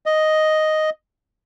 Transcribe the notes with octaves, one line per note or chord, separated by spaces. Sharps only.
D#5